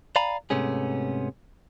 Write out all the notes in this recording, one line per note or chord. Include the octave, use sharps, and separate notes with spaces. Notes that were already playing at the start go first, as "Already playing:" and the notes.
D5 F5 G#5 A#5 B5
G#2 C3 A3 B3 C#4 G#4